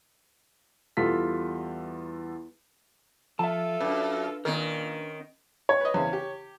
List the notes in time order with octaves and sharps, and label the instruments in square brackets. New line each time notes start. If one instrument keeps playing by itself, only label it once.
[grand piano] E2 G3 F4 A4 B6
[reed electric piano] F3 [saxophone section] F4 A4 [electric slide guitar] E5 A5
[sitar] F#2 [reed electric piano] D4 B4
[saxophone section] A#2 [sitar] D#3 [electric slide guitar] C#4 A#4
[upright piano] C#5
[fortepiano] B4 D#5
E2 C#3 C5
G4